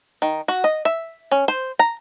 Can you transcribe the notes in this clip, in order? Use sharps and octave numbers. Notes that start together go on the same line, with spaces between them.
D#3
F#4
D#5
E5
C#4
C5
A#5